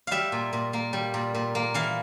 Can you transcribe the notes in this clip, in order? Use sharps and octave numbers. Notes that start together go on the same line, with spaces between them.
G3 E5 F5
A#2
A#2
A#3
G3
A#2
A#2
A#3
E3 F5